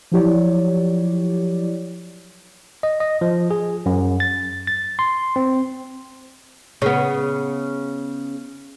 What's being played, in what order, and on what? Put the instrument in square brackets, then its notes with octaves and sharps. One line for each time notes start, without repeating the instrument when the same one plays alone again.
[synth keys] F3 F#3 E4 G4 C#5 D5
[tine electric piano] D#5
D#5
F3
G#4
F#2
A6
A6
C6
C4
[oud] C#3 B3